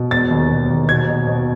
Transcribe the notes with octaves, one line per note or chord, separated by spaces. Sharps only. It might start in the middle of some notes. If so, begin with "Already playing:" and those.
Already playing: B2
E1 A6
D#2
E1
D#2
B2 G#6
B2
B2